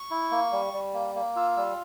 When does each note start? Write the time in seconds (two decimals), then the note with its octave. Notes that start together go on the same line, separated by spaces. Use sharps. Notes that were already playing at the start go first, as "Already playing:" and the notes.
Already playing: C#6
0.11 E4
0.31 A#3
0.52 G3
0.73 G3
0.94 A#3
1.15 A#3
1.36 F4 E6
1.57 G3 E6